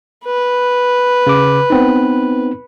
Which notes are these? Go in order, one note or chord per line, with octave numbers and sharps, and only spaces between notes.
B4
C#3 D6
B3 C4 D#4